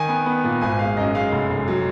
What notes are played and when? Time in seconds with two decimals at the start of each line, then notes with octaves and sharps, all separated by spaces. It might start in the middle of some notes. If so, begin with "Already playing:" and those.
Already playing: D#3 G#5
0.08 B3
0.26 B3
0.44 A#2
0.61 G#1 G#5
0.79 G#3 F5
0.97 F#2 D#5
1.15 G#3 F5
1.32 F1
1.51 F1
1.68 F#3